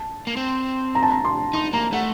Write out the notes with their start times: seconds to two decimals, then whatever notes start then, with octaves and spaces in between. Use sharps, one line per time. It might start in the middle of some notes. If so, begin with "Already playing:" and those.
Already playing: A5
0.27 A#3
0.37 C4
0.95 A#5
1.03 A5
1.11 A#5
1.25 C6
1.53 D#4 C6
1.73 A#3 A#5
1.93 A3 F#5